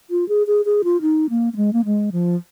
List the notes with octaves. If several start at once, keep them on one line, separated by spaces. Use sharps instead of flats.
F4
G#4
G#4
G#4
F4
D#4
A#3
A#3
G#3
A#3
G#3
F3